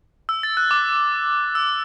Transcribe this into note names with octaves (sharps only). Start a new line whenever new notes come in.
E6
A6
F#6
D6
E6